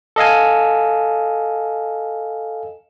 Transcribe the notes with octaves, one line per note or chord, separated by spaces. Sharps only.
A4 D#5 F5 G#5